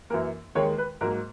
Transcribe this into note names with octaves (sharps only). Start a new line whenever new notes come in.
F#2 E3 A#3 A#4
D#2 D#3 G#3 C#5
B4
G#2 F#3 A#3 A#4